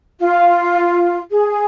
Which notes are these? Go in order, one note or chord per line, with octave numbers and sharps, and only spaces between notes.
F4
G#4